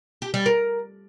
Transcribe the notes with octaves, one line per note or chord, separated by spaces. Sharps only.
G4
G3
A#4